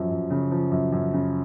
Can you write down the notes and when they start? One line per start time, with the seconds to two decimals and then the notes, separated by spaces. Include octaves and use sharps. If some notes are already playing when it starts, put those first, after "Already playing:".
Already playing: F#2 F3
0.11 F#2
0.30 C#3
0.51 F3
0.71 F#2
0.92 F#2
1.13 C#3